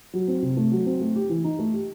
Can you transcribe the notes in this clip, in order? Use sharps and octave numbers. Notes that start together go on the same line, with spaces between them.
F#3
C4
C3
A3
F#3
C4
A3
G4
E3
D#4
A3
G4